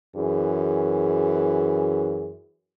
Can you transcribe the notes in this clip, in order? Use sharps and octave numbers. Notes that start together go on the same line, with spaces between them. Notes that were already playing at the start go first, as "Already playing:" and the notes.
F#2 E3 G#4